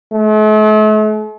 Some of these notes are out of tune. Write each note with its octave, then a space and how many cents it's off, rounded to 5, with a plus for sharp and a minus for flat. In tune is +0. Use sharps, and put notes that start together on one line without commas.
A3 -45